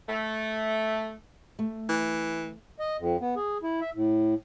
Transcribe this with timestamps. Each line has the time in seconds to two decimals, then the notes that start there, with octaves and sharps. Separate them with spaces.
0.09 A3
1.59 A3
1.89 E3
2.80 D#5
2.99 F2
3.21 B3
3.36 G#4
3.63 E4
3.81 E5
3.94 A2